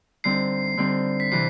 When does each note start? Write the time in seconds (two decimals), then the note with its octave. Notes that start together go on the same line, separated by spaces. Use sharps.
0.24 D3 G3 C4 D#4 C7
0.77 D3 G3 C4 D#4
1.20 B6
1.32 C3 E3 C7